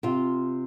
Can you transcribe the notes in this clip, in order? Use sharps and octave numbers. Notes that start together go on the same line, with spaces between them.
C3 F4